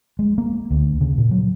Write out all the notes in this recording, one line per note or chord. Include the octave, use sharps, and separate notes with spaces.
G#3
A#3
D2
C#3
A#2
F#3